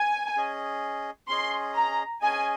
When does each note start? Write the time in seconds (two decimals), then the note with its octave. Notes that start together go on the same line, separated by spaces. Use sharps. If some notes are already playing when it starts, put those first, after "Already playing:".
Already playing: G#5
0.36 C#4 G#4 D#5
1.29 C#4 G#4 D#5 C6
1.75 A#5
2.22 C#4 G#4 D#5 G#5